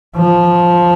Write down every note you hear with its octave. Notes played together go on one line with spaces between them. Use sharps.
F3